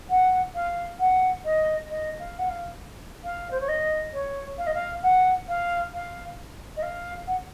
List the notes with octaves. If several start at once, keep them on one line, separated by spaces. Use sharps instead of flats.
F#5
F5
F#5
D#5
D#5
F5
F#5
F5
F5
C5
C#5
D#5
C#5
F5
D#5
F5
F#5
F5
F5
D#5
F5
F#5